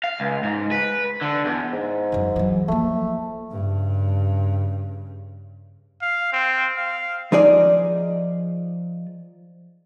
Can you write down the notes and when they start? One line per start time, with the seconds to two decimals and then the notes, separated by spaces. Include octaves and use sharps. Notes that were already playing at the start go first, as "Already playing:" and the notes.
0.04 F5
0.20 C#2
0.43 G#2
0.71 B4
1.21 D3
1.45 E2
1.72 G#2
2.12 F#2 E3
2.36 E3 F#3
2.68 F3 A3 A#3
3.51 G2 C#3
6.02 F5
6.33 C4
6.77 F5
7.32 F3 D#4 G#4 D5